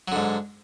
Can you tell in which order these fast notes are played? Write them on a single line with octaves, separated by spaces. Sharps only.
F#3 D3 G#2